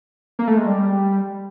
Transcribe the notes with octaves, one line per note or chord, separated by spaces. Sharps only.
A#3
A3
G#3
G3